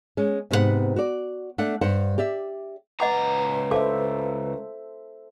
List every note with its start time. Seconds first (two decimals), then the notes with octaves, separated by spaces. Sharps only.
0.17 G#3 C#4
0.51 G#2 C3 B3 E4 B4 F#5
0.96 F#4 D5
1.58 A3 D4 F#5
1.81 G2 C5 F#5
2.18 G4 D5 E5
3.00 C#2 B4 D#5 F#5 A#5 D6
3.71 A4 C5 E5 F5 A5 D6